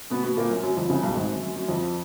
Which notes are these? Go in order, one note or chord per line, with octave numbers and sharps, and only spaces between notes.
B2 B3
B2 B3
A#2 A#3
F#2 F#3
F#2 F#3
F2 F3
C#2 C#3
B1 B2
G#1 G#2
F#2
F#2
F#2
F2 F3